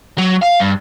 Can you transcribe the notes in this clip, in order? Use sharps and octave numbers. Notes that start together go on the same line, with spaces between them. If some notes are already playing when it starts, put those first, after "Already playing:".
F#3
F5
G2